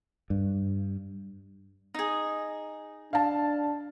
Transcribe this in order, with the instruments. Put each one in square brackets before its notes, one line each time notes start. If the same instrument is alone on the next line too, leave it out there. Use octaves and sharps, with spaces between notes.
[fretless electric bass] G2
[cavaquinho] D#4 G#4
[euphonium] D4 [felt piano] F5 A5